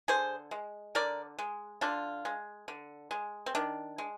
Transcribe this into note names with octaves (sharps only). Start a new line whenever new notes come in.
D3 G#4 C5
G#3
D3 A#4 D5
G#3
D3 D4 F4
G#3
D3
G#3
C4
D#3 D4
G#3